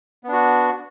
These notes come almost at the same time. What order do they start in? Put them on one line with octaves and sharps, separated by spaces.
B3 D4 F#4